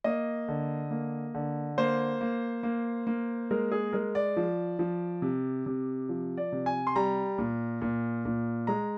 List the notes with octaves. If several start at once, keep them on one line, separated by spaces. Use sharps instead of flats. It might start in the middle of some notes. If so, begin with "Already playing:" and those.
A#3 D#5
D3
A#3
D3
A#3 C5
A#3
A#3
A#3
G#3 A#4
G#4
G#3 A#4
D5
F3
F3
C3
C3
F3
D5
C3
G#5
C6
G3 A#5
A#2
A#2
A#2
G#3 A#5